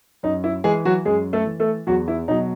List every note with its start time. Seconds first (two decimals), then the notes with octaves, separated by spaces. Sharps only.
0.23 F#2 D#4
0.44 E4
0.64 E3 G#3 G#4
0.85 F#3 F#4
1.05 F#2 G#3 G#4
1.33 A3 A4
1.46 E3
1.60 A3 A4
1.87 E2 F#3 F#4
2.08 E4
2.28 B2 F#3 D#4